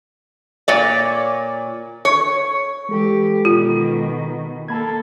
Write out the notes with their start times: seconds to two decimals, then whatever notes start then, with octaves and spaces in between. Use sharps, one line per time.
0.68 A#2 C#5 D5
2.05 C#5
2.89 E3 G#3 G4 A4
3.45 B2 D#3 F4
4.68 A#3 A4 A5 B5 G#6